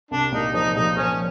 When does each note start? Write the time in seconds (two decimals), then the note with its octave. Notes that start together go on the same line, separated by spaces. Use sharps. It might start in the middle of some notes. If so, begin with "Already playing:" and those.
0.11 C2 D4
0.32 A#2 D#4
0.54 F3 D#4
0.75 A#2 D#4
0.97 F3 C#4